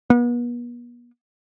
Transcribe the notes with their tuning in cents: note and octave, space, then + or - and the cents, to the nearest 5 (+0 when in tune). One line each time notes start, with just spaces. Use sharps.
B3 -40